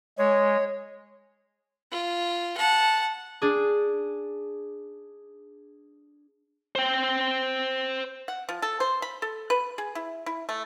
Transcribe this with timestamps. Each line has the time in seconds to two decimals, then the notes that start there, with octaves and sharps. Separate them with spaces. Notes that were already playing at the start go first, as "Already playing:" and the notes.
0.18 G#3 C#5
1.92 F4
2.57 F#5 A5
3.42 D4 G#4
6.75 C5 G5
8.28 F#5
8.49 F3
8.62 A4
8.80 C5
9.02 B5
9.22 A4
9.50 B4
9.78 G#4
9.95 E4
10.26 E4
10.49 A3